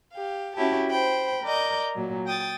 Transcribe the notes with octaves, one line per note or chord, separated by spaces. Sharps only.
G4 F5
C#4 E4 F#4 G4 A5
C5 G5 B5
A#4 D5 D#5 G6
A#2 F#3
G5 D#6 A6